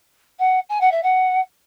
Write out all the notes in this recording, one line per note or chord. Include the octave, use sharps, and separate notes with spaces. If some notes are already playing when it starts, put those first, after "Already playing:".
F#5
G#5
F#5
E5
F#5